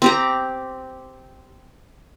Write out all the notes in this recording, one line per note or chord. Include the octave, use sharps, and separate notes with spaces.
C4 G4 A#5